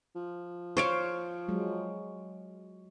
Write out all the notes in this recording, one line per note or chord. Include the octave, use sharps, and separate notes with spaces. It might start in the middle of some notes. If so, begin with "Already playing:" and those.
F3
C5 C#5 F5 C#6 D7
F#3 G#3